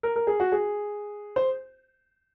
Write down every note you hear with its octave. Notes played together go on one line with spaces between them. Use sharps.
A#4
A#4
G#4
F#4
G#4
C5